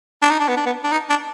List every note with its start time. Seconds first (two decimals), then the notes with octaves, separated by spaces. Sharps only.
0.22 D4
0.30 D#4
0.40 D4
0.48 B3
0.57 D4
0.66 B3
0.84 D4
0.92 D#4
1.09 D4